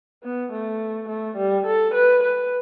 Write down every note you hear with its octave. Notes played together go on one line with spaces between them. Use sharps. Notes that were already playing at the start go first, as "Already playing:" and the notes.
B3
A3
A3
G3
A4
B4
B4